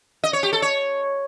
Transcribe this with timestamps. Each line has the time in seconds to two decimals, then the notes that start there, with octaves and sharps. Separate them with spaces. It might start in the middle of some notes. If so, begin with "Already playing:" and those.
0.24 D#5
0.33 C#5
0.43 G4
0.53 A4
0.62 C#5